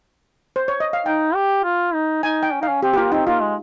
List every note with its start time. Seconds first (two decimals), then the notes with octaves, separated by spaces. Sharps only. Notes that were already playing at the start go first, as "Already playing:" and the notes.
0.56 C5
0.68 C#5
0.80 D#5
0.93 F5
1.05 D#4 G5
1.35 G4
1.65 F4
1.94 D#4
2.23 D#4 G#5
2.43 G5
2.53 C#4
2.61 D#4 F5
2.68 C#4
2.83 C4 G4
2.93 G4
2.97 A#3 F4
3.12 C4 D#4
3.27 A#3 F4
3.42 G#3